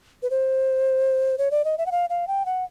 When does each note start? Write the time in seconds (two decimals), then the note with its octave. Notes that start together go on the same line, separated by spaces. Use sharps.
0.23 B4
0.30 C5
1.38 C#5
1.51 D5
1.65 D#5
1.78 E5
1.86 F#5
1.92 F5
2.10 F5
2.28 G5
2.46 F#5